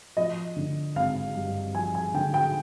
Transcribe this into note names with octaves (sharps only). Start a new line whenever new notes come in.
F3 D#5
D3
G#1 F5
G2
F3 G#5
G#5
D3 G5
G5